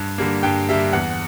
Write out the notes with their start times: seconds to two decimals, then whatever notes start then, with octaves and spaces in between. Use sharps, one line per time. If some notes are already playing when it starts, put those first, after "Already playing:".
Already playing: G2
0.18 D3 G3 A#3
0.43 G2 G5
0.69 D3 G3 A#3 E5
0.93 E2 F#5